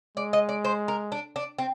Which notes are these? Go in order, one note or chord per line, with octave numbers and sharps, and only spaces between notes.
G#3 D5
D#5
D5
C5
A#4
D4
D4
C4